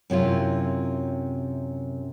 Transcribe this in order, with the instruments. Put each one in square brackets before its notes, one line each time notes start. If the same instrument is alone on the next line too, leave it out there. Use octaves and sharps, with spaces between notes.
[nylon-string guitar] F#2 C3 E4 F4